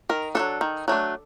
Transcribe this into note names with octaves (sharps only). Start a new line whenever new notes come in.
D#3 A#4
F#3 A3 D4 A4
D#3
F#3 A3 D4